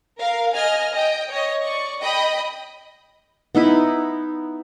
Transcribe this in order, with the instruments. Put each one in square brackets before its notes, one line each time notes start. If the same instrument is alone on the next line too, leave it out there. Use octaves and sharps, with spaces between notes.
[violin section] A#4 F5
D#5 G#5 F6
D#5 G5
C#5 D#5
D5 C#6
D#5 G5 B5 D#6
[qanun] B3 D#4 E4 B4